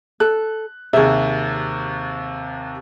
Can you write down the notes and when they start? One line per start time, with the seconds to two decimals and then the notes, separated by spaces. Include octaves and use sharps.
0.20 A4 F#6
0.93 D#2 C3 G#4 E5